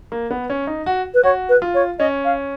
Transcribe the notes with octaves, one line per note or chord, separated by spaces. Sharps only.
A#3
B3
C#4
D#4
F#4
B4
F#4 C#5
B4
F4
C#5
C#4 D#5
F5